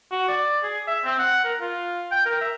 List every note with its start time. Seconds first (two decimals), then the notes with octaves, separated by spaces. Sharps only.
0.12 F#4
0.28 D5
0.63 G#4
0.88 E5
1.05 C4
1.19 F#5
1.44 A#4
1.61 F4
2.12 G5
2.26 A#4
2.41 E5